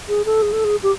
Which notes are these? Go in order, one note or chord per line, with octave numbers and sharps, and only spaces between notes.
G#4
A4
G#4
A4
G#4
G4